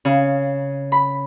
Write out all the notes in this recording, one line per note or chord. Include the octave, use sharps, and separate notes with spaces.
C#3
B5